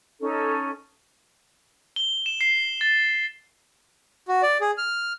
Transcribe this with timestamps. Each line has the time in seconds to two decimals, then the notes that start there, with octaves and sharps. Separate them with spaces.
0.21 C#4 D#4 A4
1.96 G7
2.26 E7
2.41 C7
2.81 A6
4.28 F#4
4.43 D5
4.61 G#4
4.78 F6